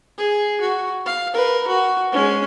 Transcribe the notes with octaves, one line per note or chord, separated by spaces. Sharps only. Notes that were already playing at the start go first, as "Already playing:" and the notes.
G#4
F#4
F5
A#4 B4
F#4
G#3 C#4